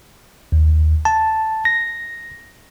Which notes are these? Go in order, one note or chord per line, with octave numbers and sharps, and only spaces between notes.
D#2
A5
A#6